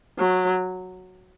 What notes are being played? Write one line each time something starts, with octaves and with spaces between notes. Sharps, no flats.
F#3